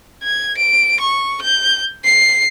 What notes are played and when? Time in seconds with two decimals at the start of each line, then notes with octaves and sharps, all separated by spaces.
0.24 G#6
0.58 D7
1.00 C#6
1.42 G6
2.05 C7